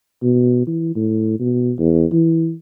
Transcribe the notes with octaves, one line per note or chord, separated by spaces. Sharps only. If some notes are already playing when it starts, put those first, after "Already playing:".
B2
E3
A2
B2
E2
E3